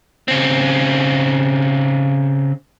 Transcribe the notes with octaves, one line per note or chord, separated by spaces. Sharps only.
C#3 C4